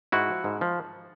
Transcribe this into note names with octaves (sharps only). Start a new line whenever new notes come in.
G#2 E4 F#4
F3
G#2
F3